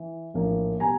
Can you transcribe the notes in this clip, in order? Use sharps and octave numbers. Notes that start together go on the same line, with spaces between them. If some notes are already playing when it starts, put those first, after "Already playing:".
Already playing: E3
A#1 A2 F3 A#3
B2 G3 G#5 A#5